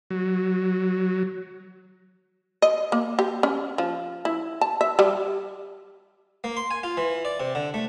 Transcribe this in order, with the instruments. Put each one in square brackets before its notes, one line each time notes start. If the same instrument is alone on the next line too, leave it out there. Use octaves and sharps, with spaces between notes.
[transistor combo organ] F#3
[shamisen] D#5
A#3
G4
C#4
F3
E4
A5
E5
G3
[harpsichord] A#3
C6
G#5
F4
E3
D5
C3
D3
A3